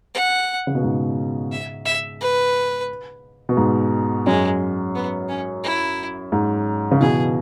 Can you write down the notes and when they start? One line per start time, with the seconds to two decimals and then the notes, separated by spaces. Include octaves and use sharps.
0.14 F#5
0.67 C#3
0.75 B2
0.83 G#2
1.52 E5
1.86 E5
2.21 B4
3.49 B2
3.57 G#2
4.26 F#2 G#3
4.95 B3
5.29 C#4
5.63 E4
6.32 G#2
6.91 C#3
7.00 B2 E3 G#4